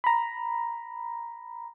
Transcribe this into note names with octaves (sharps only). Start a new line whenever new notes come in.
A#5 B5